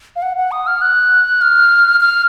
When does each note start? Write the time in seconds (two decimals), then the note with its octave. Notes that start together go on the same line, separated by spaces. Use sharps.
0.16 F5
0.22 F#5
0.37 F#5
0.51 D#6
0.67 F6
0.82 F#6
1.41 F6
2.00 F6